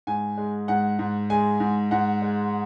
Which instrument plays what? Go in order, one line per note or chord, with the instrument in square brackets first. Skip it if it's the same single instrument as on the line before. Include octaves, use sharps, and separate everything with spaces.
[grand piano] G#2 G#5
G#3
G#2 F#5
G#2
G#3 G#5
G#2
G#2 F#5
G#3